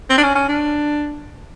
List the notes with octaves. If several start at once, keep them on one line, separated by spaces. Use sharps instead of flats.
C4
D4
C#4
C#4
D4